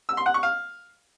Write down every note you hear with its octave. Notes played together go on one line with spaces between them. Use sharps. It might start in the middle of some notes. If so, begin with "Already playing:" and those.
E6
C6
F#5
C#6
F5